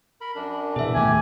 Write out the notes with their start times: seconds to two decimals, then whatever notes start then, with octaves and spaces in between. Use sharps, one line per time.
0.21 A#4 B5
0.35 F#2 D4
0.76 B2 E3 G#4 E5
0.95 D#2 A2 A3 G4 G#5